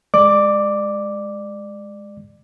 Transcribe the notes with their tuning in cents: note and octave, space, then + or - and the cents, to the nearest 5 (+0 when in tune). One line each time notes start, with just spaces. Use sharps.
G#3 +0 D5 +25 D6 +0